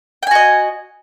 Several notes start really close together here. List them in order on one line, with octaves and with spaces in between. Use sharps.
G5 G#5 F#4 D#5